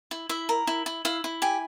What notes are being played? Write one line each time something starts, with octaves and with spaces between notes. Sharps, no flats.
E4
E4 E5
A#4
E4
E4
E4 F5
E4
G4 G#5